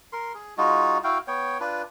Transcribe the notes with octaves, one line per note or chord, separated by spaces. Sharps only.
A#4 C6
G#4
G#3 D#4 F4 F#4
E4 F#4 F5 G5
B3 C#5 G5
D4 F4 B4